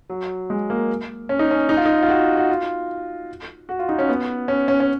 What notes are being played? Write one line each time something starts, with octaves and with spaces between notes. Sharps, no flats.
F#3
G#3
A#3
C#4
D#4
C#4
D#4
F4
D#4
F4
F#4
F#4
F4
F#4
F4
D#4
C#4
B3
C#4
C#4
C#4